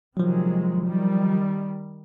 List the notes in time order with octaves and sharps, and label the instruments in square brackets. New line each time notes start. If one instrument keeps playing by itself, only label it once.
[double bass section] C3 D#3 G#3 [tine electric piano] F3 F#3
[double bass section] D#3 G3